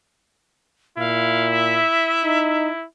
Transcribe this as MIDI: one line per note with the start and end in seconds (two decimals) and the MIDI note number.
0.98 1.82 46
0.98 2.86 64
0.98 1.50 77
1.51 2.69 76
2.24 2.70 63